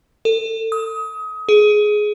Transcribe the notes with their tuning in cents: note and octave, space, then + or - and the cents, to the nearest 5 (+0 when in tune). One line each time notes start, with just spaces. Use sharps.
A4 +30
D#6 +30
G#4 +15